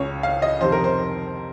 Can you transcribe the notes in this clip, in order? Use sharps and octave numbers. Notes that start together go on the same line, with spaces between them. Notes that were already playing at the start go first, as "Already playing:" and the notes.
Already playing: C#2 C#3 C#5
F5
D#5
F2 C3 D#3 C5
A#4
C5